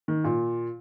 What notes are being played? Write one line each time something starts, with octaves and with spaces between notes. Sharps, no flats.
D#3
A#2